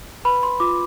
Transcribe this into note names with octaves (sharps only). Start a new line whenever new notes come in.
B4 B5
C6
F4 D6